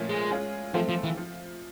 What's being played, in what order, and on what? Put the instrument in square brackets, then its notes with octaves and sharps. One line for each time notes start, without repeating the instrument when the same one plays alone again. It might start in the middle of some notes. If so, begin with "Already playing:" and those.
Already playing: [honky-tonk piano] A#2 F3 A3 C#4
[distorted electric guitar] G#3
[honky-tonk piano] G#3 C#4 F4 G#4
[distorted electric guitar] F3 [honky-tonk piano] A3 C4 F4 A4 C5
[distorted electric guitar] F3
E3
[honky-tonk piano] F3